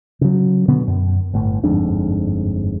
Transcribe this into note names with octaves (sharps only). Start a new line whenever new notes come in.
C#3 F#3
B2 D3 B3
F#2
G1 A2
G1 F2 G#2 D4